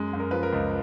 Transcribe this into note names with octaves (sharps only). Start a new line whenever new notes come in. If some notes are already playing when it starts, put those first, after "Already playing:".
Already playing: F#2 G#3
F#2
A#4
F3 B4
A#4
C#2